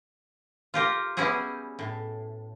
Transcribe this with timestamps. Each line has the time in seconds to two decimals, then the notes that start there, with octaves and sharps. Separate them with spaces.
0.74 F4 G4 A#4
1.17 G3 B3 C#4 E4 F#4 G#4
1.79 A2